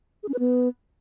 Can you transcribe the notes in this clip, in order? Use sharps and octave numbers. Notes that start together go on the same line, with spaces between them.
G#4
C#4
B4
B3